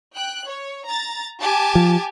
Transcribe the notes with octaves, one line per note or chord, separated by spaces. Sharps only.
G5 F#6
C#5
A#5 A6
G4 G#5 A5
F3